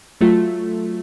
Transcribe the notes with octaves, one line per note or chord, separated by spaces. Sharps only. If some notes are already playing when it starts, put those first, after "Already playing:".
F#3 A3 F4